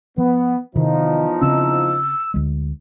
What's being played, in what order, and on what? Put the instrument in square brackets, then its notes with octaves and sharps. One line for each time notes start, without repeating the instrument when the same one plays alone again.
[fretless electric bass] F3 [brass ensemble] B3
[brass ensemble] E2 F3 D#4 [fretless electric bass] C3 D#3
[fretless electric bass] C#3 C4 C#4 [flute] E6
[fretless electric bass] D2 G#3